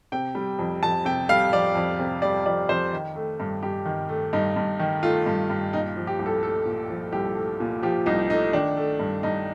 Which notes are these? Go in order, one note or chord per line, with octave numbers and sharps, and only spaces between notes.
C3 G5
G3
F2
F2 A5
C3 G5
G3 F5
F2 D5
F2
C3
G3 D5
F2 D5
F2 C5
D#3
A3
G2
G2 G4
D#3
A3
G2 D#4
G2
D#3
A3 F4
G2
G2
A#2 D#4
F3
G4
C2
A4
A3 A4
A#2
F3
C2 G4
A3
A#2
F3 G4
C2 D#4
A3 D#4
D#3 D4
A3
G2
G2 D#4